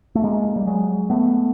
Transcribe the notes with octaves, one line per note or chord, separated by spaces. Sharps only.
A3
G#3 A#3
G3
F#3 G#3
A3 B3